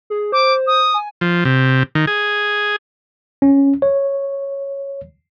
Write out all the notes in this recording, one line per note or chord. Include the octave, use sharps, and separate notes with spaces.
G#4
C5 D6
D#6
G#5
F3
C3
D#3
G#4
C#4
C#5